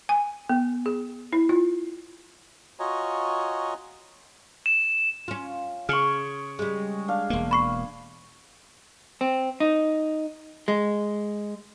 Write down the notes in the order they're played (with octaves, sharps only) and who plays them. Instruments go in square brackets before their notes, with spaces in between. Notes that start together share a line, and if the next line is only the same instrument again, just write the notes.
[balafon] G#5
B3
G#4
E4
F4
[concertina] F4 F#4 C#5 D#5 G#5 A#5
[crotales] E7
[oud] C#4 F4
[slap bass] C#3 [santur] G#4 C#6 [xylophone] F6 C#7 F#7
[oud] G3 G#3
[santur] D4 F5
[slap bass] E1 A#3
[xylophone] B5 C#6 C7
[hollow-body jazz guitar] C4
D#4
G#3